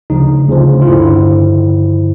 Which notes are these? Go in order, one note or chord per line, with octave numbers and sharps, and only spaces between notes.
D2 C#3 F3 D#4
D2 C#3 F3
F4
G2 D3 F3 E4